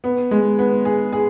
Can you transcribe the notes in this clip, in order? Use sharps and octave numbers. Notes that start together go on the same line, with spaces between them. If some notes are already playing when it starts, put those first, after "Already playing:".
B3
G#3
B3
G#4
G#4